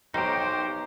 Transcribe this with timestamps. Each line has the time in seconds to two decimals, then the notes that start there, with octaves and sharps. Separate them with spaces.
0.14 B1 D#4 G4 C5 G5 A#5 D7